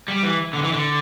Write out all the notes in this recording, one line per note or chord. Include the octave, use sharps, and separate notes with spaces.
G3
E3
D3
E3
D3